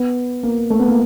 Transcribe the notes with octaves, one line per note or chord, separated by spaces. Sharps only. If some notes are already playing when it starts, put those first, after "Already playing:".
Already playing: B3
A#3
A3
B3
A#3